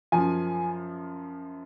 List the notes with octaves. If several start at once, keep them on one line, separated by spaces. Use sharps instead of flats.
F#2 F3 G#5